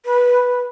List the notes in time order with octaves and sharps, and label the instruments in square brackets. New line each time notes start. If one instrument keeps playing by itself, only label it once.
[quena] B4